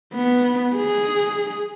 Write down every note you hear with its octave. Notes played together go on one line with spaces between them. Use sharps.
B3
G#4